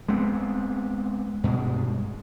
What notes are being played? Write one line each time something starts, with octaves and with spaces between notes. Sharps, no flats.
G#3 B3 C4
G2 B2 G#3